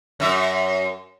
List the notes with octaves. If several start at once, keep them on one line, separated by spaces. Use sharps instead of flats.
F#2 E5